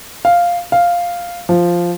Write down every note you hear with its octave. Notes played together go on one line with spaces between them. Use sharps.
F5
F5
F3